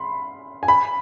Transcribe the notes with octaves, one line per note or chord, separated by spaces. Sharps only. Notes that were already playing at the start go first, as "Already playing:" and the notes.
Already playing: B5 C6
G#5
B5